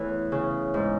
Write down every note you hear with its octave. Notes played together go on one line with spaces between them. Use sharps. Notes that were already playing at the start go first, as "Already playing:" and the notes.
Already playing: E2 E3 A3 A4 B4 C#5
C#3
G#2